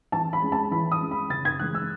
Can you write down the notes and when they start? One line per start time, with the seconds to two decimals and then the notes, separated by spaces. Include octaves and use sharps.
0.12 E3 A5
0.33 B5
0.42 G#3 C#4
0.52 A5
0.71 E3 B5
0.92 D#6
1.01 G#3 C#4
1.11 B5
1.30 C#3 A6
1.45 G#6
1.60 E3 G#3 F#6
1.75 E6